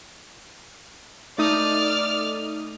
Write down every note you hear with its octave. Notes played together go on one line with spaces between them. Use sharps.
A3 D#4 D5 D#6 F6